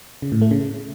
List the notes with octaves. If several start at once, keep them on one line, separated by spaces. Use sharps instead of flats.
C#3
A2
A3
C#3